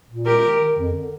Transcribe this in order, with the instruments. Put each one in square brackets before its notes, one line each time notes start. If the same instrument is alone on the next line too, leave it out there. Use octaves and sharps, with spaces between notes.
[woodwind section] A#2
[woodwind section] G#3 [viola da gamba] G4 A#4
[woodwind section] D#3
D#3
F2
D3